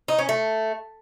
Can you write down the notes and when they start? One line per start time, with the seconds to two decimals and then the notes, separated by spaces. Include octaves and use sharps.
0.08 D#4
0.19 C#4
0.29 A3